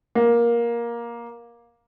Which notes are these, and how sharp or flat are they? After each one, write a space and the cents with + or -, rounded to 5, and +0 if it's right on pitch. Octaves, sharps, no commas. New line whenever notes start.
A#3 +15